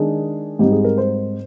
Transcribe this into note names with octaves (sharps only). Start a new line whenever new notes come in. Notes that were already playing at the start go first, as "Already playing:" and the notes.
Already playing: D#3 G#3 D4 G#4
G#2 G3 C4 D#4 G4
G#4
A#4
C5